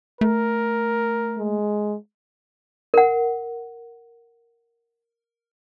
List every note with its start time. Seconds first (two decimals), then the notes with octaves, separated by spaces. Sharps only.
0.21 A3 A#4
1.38 G#3
2.94 A#4 F#5